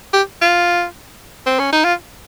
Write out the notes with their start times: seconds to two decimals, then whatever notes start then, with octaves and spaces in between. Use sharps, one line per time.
0.13 G4
0.42 F4
1.46 C4
1.59 C#4
1.73 D#4
1.85 F4